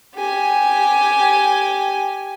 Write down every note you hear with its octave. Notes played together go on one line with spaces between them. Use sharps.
G4 G#5